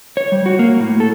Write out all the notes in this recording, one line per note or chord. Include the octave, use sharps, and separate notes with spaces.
C#5
G3
F#4
A#3
A2
A4